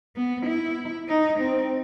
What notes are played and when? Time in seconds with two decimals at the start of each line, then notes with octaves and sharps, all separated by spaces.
0.16 B3
0.46 E4
1.08 D#4
1.39 C4